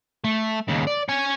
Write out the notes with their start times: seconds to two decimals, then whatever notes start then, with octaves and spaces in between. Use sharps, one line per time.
0.24 A3
0.68 D#2 C#3
0.87 D5
1.09 C#5 G#5